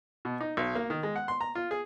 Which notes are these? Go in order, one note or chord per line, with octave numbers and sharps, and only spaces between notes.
B2
D#4
B1
A#3
D#3
G#3
F#5
C6
A#5
F4
G#4